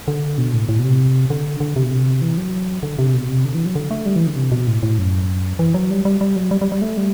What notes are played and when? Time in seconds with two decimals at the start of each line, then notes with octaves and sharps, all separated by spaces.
0.08 D3
0.38 B2
0.54 A2
0.69 A2
0.79 B2
0.84 C3
1.30 D3
1.60 D3
1.76 C3
1.83 B2
1.90 C3
2.22 E3
2.38 F#3
2.83 D3
2.99 C3
3.14 B2
3.29 C3
3.45 D3
3.55 E3
3.65 F#3
3.75 D3
3.91 A3
4.06 G3
4.16 E3
4.27 D3
4.36 C3
4.52 B2
4.67 A2
4.83 A2
4.98 F#2
5.59 E3
5.74 F#3
5.90 G3
6.05 G3
6.21 G3
6.36 F#3
6.51 G3
6.61 G3
6.72 G3
6.82 A3
6.97 G3